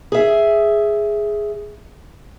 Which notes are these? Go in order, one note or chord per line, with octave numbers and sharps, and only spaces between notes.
G#4 E5